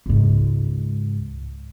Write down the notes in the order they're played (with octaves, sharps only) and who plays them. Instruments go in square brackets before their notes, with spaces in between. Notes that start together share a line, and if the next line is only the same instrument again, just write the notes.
[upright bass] C#2 G#2